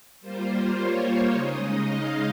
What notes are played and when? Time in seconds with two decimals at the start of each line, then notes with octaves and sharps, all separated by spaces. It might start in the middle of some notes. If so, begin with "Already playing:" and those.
0.21 G3 A#3 F4 C5
0.76 C#5
1.32 C#3 G#3 D#4 D#5
1.87 F5